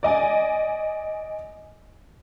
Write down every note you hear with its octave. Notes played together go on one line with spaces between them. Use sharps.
D5 D#5 G#5